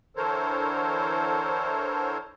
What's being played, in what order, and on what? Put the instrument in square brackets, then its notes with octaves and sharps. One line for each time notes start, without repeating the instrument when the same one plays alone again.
[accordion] D3 E3 A4 A#4 C5 C#5